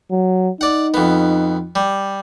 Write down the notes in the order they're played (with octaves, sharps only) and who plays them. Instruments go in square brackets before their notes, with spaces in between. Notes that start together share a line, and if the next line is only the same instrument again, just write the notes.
[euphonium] F#3
[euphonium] D#4 [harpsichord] D5 F#5
[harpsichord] F2 B3
G3